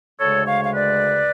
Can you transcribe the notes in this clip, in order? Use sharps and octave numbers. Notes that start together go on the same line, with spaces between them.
D2 C#3 G#3 A4 C#5
C#5 F5
F5
B4 D5